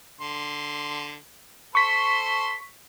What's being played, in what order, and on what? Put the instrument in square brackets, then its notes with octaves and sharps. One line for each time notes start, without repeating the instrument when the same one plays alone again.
[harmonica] D3 C6
[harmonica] A4 C5 C6 [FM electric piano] C#6 B6